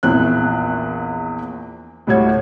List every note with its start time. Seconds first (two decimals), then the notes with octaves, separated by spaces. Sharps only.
0.03 A#1 E2 E3 C4 F#6
2.07 D2 A2 G3 F#4 C#5 G#6